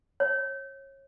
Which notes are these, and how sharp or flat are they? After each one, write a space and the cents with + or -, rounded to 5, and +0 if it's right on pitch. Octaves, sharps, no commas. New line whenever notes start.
C#5 -25